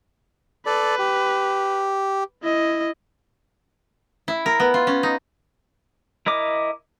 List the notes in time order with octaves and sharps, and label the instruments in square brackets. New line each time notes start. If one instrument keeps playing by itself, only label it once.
[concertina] A4 D5 [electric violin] B4
[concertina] G4
[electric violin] E4 D#5
[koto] E4
A#4
B3
F4
C#4
D#4
[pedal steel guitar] E4 A#4 D#5 D6